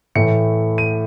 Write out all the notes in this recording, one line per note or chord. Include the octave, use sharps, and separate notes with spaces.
A2 E3 A3 C#7
D#7